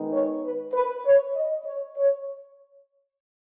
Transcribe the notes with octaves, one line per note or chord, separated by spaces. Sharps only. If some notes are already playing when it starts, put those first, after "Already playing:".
Already playing: D#3 G#3 B3 D#4
C#5
B4
B4
C#5
D#5
C#5
C#5